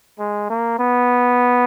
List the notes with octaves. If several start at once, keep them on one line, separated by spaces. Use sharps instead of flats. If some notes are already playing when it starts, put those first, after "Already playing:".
G#3
A#3
B3